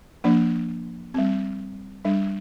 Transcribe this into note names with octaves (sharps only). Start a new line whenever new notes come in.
F3 A#3 D4
G3 C4
G3 D4